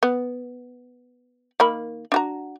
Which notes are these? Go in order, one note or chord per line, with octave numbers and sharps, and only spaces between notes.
B3
D#3 A#3 B5
D4 F#4 A#5